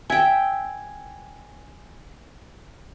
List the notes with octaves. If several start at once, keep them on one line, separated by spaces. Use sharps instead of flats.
E5 G5 G#5 G#6